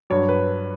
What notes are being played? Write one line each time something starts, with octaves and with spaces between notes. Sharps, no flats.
G2 F#3 C#5
B4